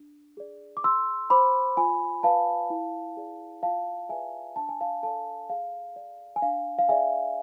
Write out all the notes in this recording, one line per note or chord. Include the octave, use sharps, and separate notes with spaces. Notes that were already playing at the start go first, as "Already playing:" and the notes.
Already playing: D4
G#4 D5
D6
G#4 C6 E6
C5 B5 D6
F4 G#5 B5
B4 D5 F5 A5
E4
G#4 D5
F4 F5 A5
G#4 B4 D5 E5 G#5
D4 A5
G#5
F5 A5
A4 D5 F5 A5
G#4 F5
D5
G#5
D4 F5
F5
G#4 D5 E5 G#5